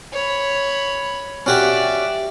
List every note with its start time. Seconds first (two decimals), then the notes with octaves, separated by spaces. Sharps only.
0.13 C#5 B5
1.46 C#4 F#4 G4 D5 E5